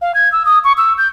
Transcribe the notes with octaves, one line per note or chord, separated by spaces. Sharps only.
F5
G#6
E6
D#6
C#6
E6
G6